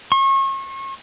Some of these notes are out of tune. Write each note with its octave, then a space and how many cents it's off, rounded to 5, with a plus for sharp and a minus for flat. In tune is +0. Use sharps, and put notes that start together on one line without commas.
C#6 -35